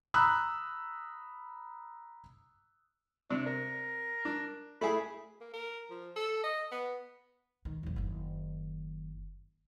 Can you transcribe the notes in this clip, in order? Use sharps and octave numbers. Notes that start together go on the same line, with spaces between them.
A#5 B5 D#6 E6 F#6
C3 D4
A#4
D4
A3 E4 G#4 B5
A#3
A#4
F3
A4
D#5
B3
D#3
F#1 D#2
F#1 D#3